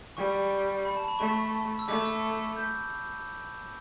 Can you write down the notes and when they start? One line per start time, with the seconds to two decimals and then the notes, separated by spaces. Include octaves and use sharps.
0.17 G3 C#6
0.85 B5
0.97 A5
1.08 B5
1.19 A3 C#6
1.79 E6
1.88 A3 D6
2.05 E6
2.56 G6